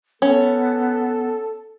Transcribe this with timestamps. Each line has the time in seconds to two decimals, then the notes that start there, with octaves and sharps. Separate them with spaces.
0.22 B3 C#4 A4